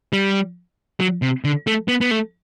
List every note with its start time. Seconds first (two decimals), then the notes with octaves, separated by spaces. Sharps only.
0.13 G3
1.00 F#3
1.22 C3
1.44 D3
1.67 A3
1.88 B3
2.01 B3
2.11 A3